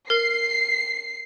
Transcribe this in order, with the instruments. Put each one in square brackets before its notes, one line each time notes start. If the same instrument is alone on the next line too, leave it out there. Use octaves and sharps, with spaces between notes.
[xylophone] A#4 [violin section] C7